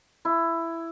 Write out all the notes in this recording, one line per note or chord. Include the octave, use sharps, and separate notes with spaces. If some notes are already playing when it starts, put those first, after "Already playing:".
E4